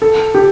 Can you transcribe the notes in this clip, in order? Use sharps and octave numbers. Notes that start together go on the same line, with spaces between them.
A4
G4